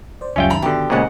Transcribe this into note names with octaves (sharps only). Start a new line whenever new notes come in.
C5 D5
C#2 F#2 G3 C#4 F4 D5 E5 G5
G2 D#3 A#5 B5
B2 D3 G4
A#2 C#3 G#3 C5 D#5 F#5